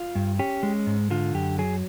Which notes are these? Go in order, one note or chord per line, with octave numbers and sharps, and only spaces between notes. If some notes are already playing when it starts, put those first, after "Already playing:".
Already playing: F4
G2
C#4 G4
G#3
G#2
D3 F4
F#2 G4
F#3 G#4